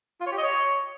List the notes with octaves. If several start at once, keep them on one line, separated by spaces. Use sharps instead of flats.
F4
C#5
G4
D#5
C#5